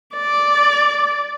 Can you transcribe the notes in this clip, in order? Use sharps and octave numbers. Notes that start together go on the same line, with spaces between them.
D5